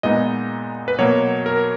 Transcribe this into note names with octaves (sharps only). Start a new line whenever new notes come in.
A#2 G#3 B3 D#4 D#5
B4
B2 F#3 A#3 C#5
A#4